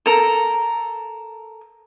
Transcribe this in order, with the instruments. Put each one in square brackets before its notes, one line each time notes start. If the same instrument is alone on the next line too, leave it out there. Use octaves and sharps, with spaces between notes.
[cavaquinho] A4 A#4